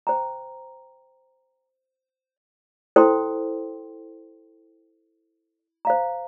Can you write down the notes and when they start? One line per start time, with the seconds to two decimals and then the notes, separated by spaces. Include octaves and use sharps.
0.07 C5 G5 A#5
2.96 E4 A4 C5 G5 C6
5.85 C5 F5 A#5